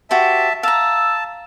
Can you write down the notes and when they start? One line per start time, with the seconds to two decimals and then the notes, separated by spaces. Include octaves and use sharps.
0.11 F#4 G4 C5 E5 A5
0.63 F5 A5 A#5 E6